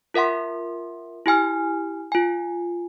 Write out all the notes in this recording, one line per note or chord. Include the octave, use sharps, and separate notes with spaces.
F4 A#4 E5 F#5 C6
E4 G4 G#5 F6
F4 G#5